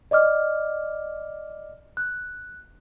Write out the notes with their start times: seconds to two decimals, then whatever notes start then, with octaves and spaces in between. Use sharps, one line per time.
0.11 D5 D#5 D6 F6
1.97 F#6